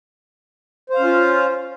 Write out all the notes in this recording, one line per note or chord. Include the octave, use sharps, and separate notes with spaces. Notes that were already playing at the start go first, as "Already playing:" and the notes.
C#4 F4 C5 F5